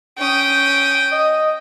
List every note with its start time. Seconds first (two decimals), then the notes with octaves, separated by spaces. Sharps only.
0.19 C#4 G5 D#6
1.12 D#5